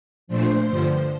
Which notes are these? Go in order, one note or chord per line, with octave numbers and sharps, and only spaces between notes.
A#2 F3 A3 D4 C5
G2 D3 F3